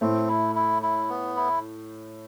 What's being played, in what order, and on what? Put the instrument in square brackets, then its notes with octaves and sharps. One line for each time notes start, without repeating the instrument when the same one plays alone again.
[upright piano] A2 A3 [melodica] C4
[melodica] E4
E4
E4
B3
E4